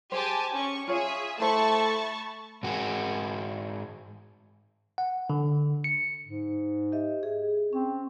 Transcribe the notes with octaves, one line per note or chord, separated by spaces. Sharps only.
G4 G#4 C5 G#5 A5
C#4 C#6
F4 G#4 C#5 E5
A3 E4 C5 A5 B5 C#6
G#2 F#4 G#4
F#5
D3
C#7
G#2
G4 D#5 E5
G#4
C4 C#4